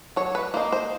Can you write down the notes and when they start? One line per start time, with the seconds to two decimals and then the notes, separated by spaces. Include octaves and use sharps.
0.16 F#3 C#5
0.35 B4
0.54 A#3 D#4 C5
0.72 C5